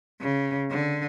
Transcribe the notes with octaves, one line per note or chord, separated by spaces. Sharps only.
C#3
D3